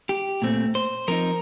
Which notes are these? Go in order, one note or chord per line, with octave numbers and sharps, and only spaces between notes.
G4
A#2 A3 C4
C5
F3 C4 D#4 A#4